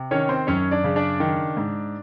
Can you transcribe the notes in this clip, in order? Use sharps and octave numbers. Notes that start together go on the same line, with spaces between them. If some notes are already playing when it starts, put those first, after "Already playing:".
Already playing: C3
D#3 C#4 C#5
C4 C5
F#2 C#4 C#5
D4 D5
C#3
D4 D5
D#3
G#2